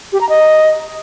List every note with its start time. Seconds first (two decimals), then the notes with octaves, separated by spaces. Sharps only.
0.13 G4
0.21 A#5
0.29 D#5